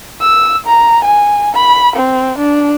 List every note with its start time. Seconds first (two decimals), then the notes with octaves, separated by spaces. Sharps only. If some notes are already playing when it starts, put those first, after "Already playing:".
0.21 E6
0.66 A#5
1.04 G#5
1.55 B5
1.96 C4
2.38 D4